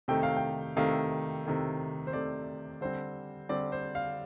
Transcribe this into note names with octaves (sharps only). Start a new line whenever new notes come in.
C3 D#3 A3 G5
F5
G5
C3 D#3 A3 F5
C3 D#3 A3
C5
C3 D#3 A3 D5
D3 G3 C4 C5
D3 G3 C4 D5
C5
F5